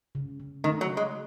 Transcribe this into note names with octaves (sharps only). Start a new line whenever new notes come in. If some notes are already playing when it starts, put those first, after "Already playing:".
C#3
C#3
D#3 A3
F#3
A3
G#3